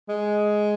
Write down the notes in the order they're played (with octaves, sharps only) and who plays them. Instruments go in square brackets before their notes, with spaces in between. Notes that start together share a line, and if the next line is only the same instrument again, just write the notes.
[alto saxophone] G#3